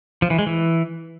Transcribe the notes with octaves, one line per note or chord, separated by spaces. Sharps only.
F3
E3
G#3
E3